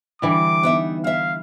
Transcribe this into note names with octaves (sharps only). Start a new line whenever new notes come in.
D3 E3 G3 D6
B3 D#4 E5
E4 E5 F5